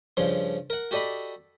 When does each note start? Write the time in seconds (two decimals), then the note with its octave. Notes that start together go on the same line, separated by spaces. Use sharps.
0.17 G2 C#3 F3 C6
0.70 A#4 F#5
0.91 F#4 G4 A4 D5 D#5 B5